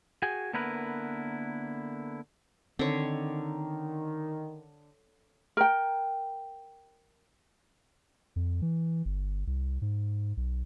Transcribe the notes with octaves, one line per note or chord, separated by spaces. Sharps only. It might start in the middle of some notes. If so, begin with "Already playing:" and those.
F#4 G#4 G5 G#5
D3 A#3 B3 E4 A#4 B4
D3 D#3 C4 C#5
A#4 G5
F2
E3
G1
C2
G#2
B1